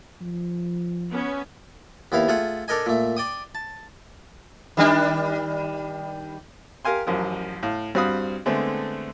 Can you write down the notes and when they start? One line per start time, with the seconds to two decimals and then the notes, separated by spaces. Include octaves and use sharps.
0.21 F3
1.10 B3 C#4
2.12 D#2 B3 E4 F5
2.28 A3 F4 G#4 F#5
2.68 D4 A4 A#4 D#5 G#5
2.86 A#2 A3
3.17 D5 G5 D#6
3.55 A5
4.77 D#3 G3 D4
6.85 G4 A#4 F5 G#5 C6
7.07 A1 F#2 F3 A#4
7.63 A2 F5
7.95 G2 C4 F#4 F5 B5 D#6
8.46 D3 G#3 A3 B3 C4